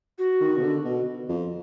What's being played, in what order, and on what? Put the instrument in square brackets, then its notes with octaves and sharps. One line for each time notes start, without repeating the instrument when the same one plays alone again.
[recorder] F#4
[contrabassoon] D#3
B2
D3
B2
F2